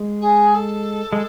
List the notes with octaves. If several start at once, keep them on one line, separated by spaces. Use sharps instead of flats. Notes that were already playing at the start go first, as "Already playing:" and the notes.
Already playing: G#3
G#4
A4
G#3